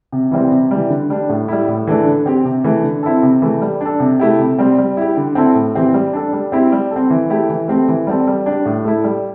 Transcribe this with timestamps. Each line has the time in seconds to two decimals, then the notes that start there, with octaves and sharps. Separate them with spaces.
0.12 C3
0.31 E3 G3 C4
0.51 C3
0.71 E3 G3
0.90 D3
1.10 G3 D4
1.29 A2
1.48 G3 E4
1.68 A2
1.87 E3 A3 D4 A4
2.06 D3
2.26 C4 G4
2.45 C3
2.64 E3 A3
2.84 D3
3.03 C4 E4 A4
3.23 C3
3.42 E3 A3
3.61 G3
3.81 D4 A4
4.00 C3
4.19 A3 E4 G4
4.39 C3
4.58 G3 C4
4.78 G3
4.97 E4 G4
5.17 D3
5.35 C4 E4 A4
5.55 A2
5.75 E3 C4 G4
5.94 G3
6.13 D4 A4
6.33 G3
6.52 C4 E4 G4
6.72 G3
6.91 A4
6.96 C4
7.10 E3
7.30 A3 E4 G4
7.50 E3
7.68 A3 C4 G4
7.88 E3
8.07 G3 C4 A4
8.27 G3
8.46 D4 G4
8.66 A2
8.85 A3 E4
9.04 G3